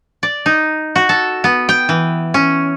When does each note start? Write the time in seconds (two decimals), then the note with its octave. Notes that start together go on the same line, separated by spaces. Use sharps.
0.23 D5
0.46 D#4
0.96 F#4
1.09 A4
1.44 B3
1.69 G5
1.89 E3
2.34 C#4